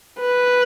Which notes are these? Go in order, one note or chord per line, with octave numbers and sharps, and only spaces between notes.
B4